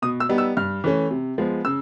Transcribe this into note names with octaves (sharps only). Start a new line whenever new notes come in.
B2 D#6
E6
G3 B3 D#4
E6
G2 F6
E3 A3 C#4
C3
F3 G#3 B3
C#3 E6